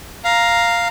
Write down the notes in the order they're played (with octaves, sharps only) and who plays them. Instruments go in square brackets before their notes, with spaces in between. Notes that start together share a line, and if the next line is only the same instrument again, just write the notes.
[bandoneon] F5 [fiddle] A#5